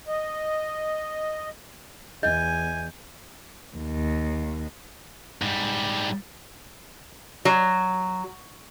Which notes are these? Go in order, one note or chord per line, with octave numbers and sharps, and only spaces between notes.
D#5
E2 D#5 G#5 G6
D#2
G#2 G3
F#3